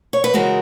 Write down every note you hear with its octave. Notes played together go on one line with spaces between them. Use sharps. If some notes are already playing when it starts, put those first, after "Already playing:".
C#5
B4
C#3 E3 G#3 F#4 A#4